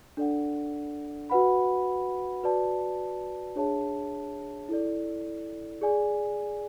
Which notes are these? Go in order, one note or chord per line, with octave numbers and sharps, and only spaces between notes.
D4 A4 D5 F#5
F#4 B4 F#5 B5
F#4 B4 D5 A5
D4 G#4 C#5 E5 A5
E4 A4 D5
G#4 D5 G#5